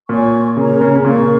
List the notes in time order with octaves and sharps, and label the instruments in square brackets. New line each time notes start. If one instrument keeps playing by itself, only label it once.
[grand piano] A#2 [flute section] F4 C#5 G#5 C#6
[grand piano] C#3 [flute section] C#4 A#4 C#5 A#5
[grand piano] C#3
C#3
[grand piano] A#2 [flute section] A#4 F5 C#6
[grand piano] C#3